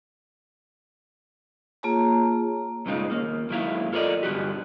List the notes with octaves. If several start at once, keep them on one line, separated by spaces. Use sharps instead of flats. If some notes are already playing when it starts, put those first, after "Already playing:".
A#3 F4 G#4 C#5 A5 A#5
B1 G2 C#3 G#3 D#4 F4
D#2 A#3
G#2 D#3 F#3 A#3 E4 F5
F4 A4 A#4 C5 D5 D#5
G2 D3 D#3 F#4 G4